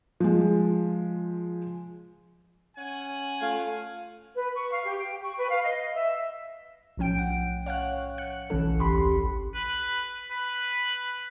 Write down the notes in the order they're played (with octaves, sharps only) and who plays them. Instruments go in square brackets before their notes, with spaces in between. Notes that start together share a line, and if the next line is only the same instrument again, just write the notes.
[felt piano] F3 G#3
[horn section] C#4 F#5 G#5
[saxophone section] A3 F4 F5
[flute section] B4
C#6
F5
G4
G5
C#6
B4
F5
D#5
E5
[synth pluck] B1 A2 F3 C#4 G5 D7
F#5
C#5 F5 F#5 F#6
F#6 C#7
B1 D3 E3 C#4 A4
G#1 D#2 G4 B5 C6
[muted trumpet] B4
B4